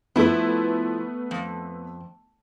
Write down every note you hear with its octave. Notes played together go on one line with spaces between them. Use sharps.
F3 A3 B3 E4
F2